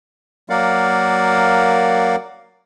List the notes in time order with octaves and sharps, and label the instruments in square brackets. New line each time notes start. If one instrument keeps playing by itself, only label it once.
[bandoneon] F#3 A#3 A#4 D5 F5 F#5